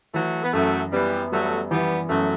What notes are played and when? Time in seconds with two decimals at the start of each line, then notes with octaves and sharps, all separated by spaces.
0.14 E3 F#3 A3
0.43 B3
0.53 F#2 F#3 A3
0.92 E3 G3 B3
1.32 F#3 G3 A3
1.71 E3 G3 B3
2.09 F#2 F#3 A3